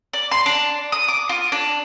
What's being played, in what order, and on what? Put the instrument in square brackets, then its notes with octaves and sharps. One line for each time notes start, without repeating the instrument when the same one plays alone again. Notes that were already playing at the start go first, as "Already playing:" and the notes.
[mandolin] D5
C6
D4
D#6
D6
F4
D4